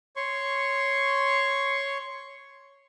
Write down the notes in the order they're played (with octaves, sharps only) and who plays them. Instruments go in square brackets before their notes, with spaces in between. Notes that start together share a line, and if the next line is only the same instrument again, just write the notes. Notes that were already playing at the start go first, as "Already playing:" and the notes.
[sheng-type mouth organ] C#5 C6 C#6